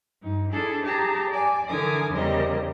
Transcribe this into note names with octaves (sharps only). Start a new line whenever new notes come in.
G2 D#4
D4 E4 G#4 A4
G4 G#4 A5 A#5
D5 G#5
D3 E3 A#4 G#5 D6 D#6
E2 C#3 G3 C4 A#4 D#5